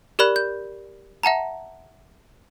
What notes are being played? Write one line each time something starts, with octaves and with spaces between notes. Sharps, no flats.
G4 A#4 D5 B5 F#6
G6
E5 F#5 A5 A#5